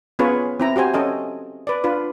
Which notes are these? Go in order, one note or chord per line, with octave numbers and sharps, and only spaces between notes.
B3 C#4 F4 G#4 B4 C#5
C4 E4 A#5
F#4 G4 C5 G#5
C#4 A4 D#5 G#5
B4 D5
D4 F4 B4